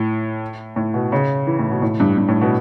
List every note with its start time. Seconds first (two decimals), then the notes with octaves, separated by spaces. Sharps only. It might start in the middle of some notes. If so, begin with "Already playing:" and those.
Already playing: A2
0.76 A2
0.94 B2
1.12 C#3
1.47 E3
1.59 A2
1.70 B2
1.82 A2
2.00 G2
2.18 G2
2.28 A2
2.41 B2